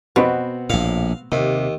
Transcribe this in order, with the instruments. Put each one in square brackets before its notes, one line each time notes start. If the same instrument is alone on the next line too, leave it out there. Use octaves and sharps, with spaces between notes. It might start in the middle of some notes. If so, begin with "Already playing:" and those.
[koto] B2 [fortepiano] B3 C4 F#4
[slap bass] A#1 A2 [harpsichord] F5
[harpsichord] D#2 [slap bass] C3